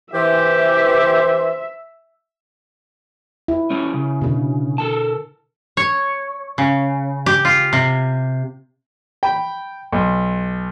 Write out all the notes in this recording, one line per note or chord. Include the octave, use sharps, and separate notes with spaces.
E3 G4 C5 E5
E4
G3 C#4
C#3
B2 D3
A4 A#4 A5
C#5
C#3
G4
F4
C3
G5 B5
B1